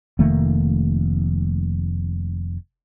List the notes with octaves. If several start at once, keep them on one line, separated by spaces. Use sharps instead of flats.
F1 D#3 A3 A#3